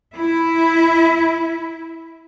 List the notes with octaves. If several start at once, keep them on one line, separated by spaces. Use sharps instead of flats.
E4 E5